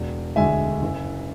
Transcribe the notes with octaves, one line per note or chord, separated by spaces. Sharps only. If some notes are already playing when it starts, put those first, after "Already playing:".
Already playing: E1
D2 D3 G#3 E5 G#5
F#1